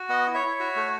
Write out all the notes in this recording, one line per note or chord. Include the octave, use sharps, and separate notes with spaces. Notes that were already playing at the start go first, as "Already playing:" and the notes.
Already playing: F#4
B3 D#5 F#5
E4
C#5 E5
E4
F#4
A3